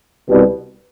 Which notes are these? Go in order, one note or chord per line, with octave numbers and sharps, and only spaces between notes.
C2 B2 G3